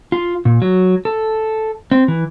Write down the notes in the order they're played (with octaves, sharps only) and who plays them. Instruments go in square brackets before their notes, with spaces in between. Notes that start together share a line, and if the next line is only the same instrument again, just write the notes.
[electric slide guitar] F4
A#2
F#3
A4
C4
E3